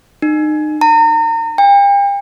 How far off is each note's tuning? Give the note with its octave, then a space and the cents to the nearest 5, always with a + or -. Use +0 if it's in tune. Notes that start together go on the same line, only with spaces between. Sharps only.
D#4 -35
A#5 -35
G5 +40